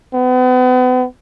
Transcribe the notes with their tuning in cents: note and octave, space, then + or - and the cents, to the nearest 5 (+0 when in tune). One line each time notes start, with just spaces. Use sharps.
B3 +40